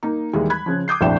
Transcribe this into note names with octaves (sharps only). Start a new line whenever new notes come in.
A#3 D#4
D#2 E3 G3 G#3
B5 F#6 G#6
C#3 F3
D6 D#6 G6 C7
F1 A#1 D4 E4 G5 E7